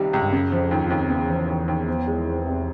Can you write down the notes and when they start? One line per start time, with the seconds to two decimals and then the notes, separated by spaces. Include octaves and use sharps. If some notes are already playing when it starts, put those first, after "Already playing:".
Already playing: C#2 C3 D#3 G3
0.13 C#2
0.22 G2
0.33 F#2 C#3
0.52 F3
0.58 F2
0.71 D#2
0.85 F2
0.91 D#2
0.99 F2
1.10 E2 C#3
1.30 F3
1.49 D#2
1.68 D#2
1.88 F3
2.07 G#3
2.28 C4
2.46 C3